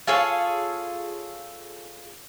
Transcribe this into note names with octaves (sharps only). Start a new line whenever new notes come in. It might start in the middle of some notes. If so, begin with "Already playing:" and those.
F4 G#4 A4 C#5